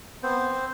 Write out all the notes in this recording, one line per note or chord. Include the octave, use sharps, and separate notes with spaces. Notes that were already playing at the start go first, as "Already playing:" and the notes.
B3 C4 C5